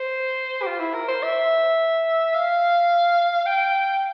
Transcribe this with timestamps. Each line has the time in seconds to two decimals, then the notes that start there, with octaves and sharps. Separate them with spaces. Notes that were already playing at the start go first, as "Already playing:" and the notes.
Already playing: C5
0.62 G4
0.66 F4
0.80 E4
0.94 A#4
1.08 C5
1.23 E5
2.34 F5
3.46 G5